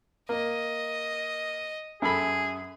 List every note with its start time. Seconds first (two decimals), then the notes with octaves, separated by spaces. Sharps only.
0.29 A#3 D#5
2.02 F#2 G#4 A4 B5